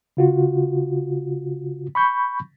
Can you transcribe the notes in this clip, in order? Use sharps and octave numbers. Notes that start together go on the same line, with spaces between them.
C#3 F4 F#4
B5 C#6 G6